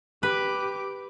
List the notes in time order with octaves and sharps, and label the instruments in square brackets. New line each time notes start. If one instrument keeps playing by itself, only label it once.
[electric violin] G4 D6 [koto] B4